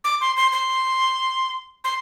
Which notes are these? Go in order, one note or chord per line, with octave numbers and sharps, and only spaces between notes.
D6
C6
C6
C6
C6